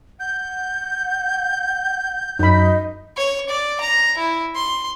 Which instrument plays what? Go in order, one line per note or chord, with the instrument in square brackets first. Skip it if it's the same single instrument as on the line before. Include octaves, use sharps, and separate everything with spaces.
[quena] F#5 [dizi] G6
[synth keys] F#2 [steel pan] D#4 B5 [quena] D#5
[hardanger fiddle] C#5
D5
A#5
E4
C6